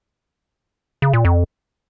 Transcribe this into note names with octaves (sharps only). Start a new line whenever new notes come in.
C#3
A#2
F2